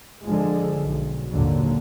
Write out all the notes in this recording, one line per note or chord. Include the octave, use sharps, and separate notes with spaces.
D3 F3 G#3
B1
G#1 D#2 A#2 D3 F#3